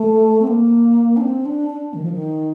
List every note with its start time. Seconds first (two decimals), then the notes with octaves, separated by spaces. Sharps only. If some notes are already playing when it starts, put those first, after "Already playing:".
Already playing: A3
0.42 C4
0.47 A#3
1.17 D4
1.21 C4
1.46 D4
1.70 D4
1.94 D#3
2.03 F3
2.12 D#3